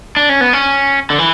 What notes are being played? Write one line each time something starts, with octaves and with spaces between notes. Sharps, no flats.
D4
C#4
B3
C#4
D3
E3